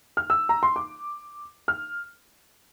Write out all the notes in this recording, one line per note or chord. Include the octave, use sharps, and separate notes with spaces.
F6
E6
A#5
C6
D6
F6